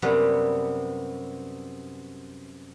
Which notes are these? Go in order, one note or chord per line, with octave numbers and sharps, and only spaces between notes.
F#2 C3 G3 B3